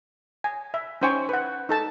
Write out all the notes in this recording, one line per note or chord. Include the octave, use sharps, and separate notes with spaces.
G#5
E5
C#4 D#4 C5 G5 G#5 C#6
B4 F#5
D#4 A4 A5